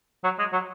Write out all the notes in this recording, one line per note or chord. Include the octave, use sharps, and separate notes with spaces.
F#3
G#3
F#3